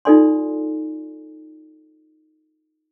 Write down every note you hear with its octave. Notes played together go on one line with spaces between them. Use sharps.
D#4 F4 A4 D5 G#5 C6